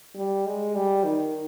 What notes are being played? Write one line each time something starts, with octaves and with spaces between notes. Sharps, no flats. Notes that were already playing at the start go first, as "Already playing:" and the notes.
G3
G#3
G3
D#3